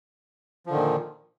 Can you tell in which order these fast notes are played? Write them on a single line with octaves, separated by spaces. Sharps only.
F3 D3 D#3 A#2